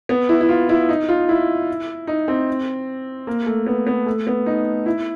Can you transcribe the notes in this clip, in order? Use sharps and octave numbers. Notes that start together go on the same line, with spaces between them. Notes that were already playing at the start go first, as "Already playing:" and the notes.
B3
E4
E4
F4
E4
D#4
F4
E4
D#4
C4
A#3
A3
B3
B3
A3
B3
D#4
E4